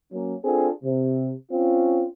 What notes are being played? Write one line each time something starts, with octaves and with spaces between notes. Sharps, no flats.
F#3 A#3 C#4
C4 D4 F4 G#4 A4
C3
C4 C#4 F4